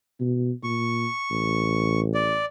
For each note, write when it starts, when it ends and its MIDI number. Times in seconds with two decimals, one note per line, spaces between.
0.20 0.52 47
0.63 1.06 46
0.63 2.00 85
1.31 2.42 33
2.15 2.45 74